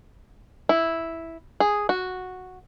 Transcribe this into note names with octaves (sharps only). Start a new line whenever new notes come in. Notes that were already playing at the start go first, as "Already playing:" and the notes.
E4
G#4
F#4